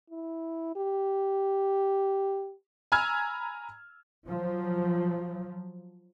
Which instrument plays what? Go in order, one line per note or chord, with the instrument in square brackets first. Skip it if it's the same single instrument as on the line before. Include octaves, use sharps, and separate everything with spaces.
[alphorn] E4
G4
[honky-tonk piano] G#5 A#5 B5 E6 F6 G#6
[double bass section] F3 F#3